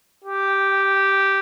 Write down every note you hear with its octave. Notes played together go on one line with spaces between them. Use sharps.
G4